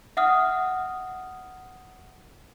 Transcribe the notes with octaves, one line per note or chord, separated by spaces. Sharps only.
E5 F#5 D#6 F6